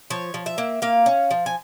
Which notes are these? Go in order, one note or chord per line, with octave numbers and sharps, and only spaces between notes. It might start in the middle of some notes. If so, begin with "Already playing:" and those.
F3 C#5
F3
E5
A#3
A#3 F5
C#4
F3
G#5